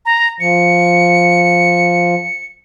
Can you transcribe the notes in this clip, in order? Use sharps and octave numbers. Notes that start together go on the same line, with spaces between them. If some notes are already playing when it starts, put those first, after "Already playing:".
A#5
F3 C#7